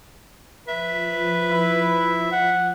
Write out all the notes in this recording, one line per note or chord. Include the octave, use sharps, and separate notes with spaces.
F3 B4 E5
E4
F#5